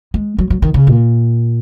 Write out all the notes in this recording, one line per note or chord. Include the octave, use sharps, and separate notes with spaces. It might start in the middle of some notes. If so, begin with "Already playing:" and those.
G#3
F#3
F#3
D#3
C#3
A#2